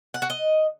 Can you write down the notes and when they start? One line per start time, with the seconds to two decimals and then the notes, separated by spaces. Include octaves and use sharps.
0.14 F#5
0.22 F#4
0.30 D#5